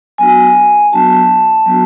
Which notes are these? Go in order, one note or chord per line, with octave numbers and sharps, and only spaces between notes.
F#3 B3 D4 F#4 G#5
F#3 B3 D4 F#4 A5
F#3 B3 D4 F#4